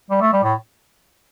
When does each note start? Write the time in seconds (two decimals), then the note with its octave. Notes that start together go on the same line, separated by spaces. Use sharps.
0.10 G3
0.21 A3
0.32 G3
0.43 A2